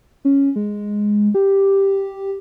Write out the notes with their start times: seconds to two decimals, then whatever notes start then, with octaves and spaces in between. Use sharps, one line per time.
0.25 C#4
0.56 G#3
1.34 G4